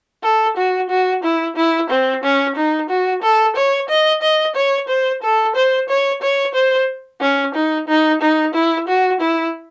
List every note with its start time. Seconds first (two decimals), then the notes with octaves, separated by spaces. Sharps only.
0.23 A4
0.57 F#4
0.90 F#4
1.23 E4
1.56 E4
1.90 C4
2.23 C#4
2.56 D#4
2.90 F#4
3.22 A4
3.56 C#5
3.89 D#5
4.22 D#5
4.55 C#5
4.88 C5
5.23 A4
5.56 C5
5.89 C#5
6.22 C#5
6.55 C5
7.21 C#4
7.54 D#4
7.88 D#4
8.21 D#4
8.54 E4
8.88 F#4
9.20 E4